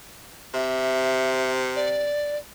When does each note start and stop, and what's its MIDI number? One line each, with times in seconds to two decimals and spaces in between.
0.54 2.16 48
0.54 1.52 76
1.76 2.37 74